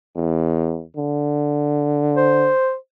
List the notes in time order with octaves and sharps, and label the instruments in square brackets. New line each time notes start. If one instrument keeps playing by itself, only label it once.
[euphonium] E2
D3
[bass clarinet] C5